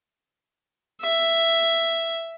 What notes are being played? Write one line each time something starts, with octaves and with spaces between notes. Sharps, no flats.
E5